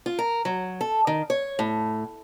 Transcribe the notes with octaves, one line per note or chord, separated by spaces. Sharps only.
F4
A#4
F#3
A4
D#3
C#5
A2